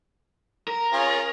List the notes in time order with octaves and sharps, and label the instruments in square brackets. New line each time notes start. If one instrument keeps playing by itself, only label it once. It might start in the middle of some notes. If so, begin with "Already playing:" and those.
[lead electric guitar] A#4
[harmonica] C#4 F4 G#4